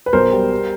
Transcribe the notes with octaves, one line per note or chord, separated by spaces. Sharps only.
B4
B1 A#4 C5
G3
G3